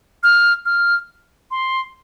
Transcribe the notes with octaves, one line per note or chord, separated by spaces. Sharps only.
F6
F6
C6